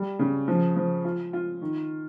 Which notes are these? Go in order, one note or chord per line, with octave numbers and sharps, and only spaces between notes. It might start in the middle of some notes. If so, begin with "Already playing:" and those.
Already playing: G3
C#3
F3
F3
F4
F4
D#3